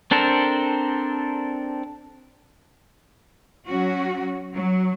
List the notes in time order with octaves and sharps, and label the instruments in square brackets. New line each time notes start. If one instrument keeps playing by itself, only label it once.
[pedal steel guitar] C4 D4 A4 A#4 C5
[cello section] F#3 C#4 F#4
F#3